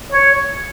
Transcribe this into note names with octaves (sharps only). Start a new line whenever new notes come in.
C#5